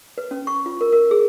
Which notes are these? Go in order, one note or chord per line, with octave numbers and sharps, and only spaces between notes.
B4
C#4
C#6
F4
A#4
A#4
G#4